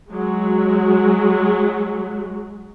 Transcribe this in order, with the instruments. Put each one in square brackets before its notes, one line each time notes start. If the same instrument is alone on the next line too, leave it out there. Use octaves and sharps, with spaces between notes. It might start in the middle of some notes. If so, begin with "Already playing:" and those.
[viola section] F#3 G#3 F#4